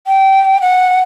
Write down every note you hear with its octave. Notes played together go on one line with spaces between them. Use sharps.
G5
F#5